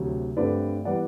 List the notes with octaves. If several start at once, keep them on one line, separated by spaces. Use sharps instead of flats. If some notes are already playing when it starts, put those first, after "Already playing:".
Already playing: D2 C3 F#3
G2 D3 A3 C4 B4 D5
E3 G3 B3 D5 F#5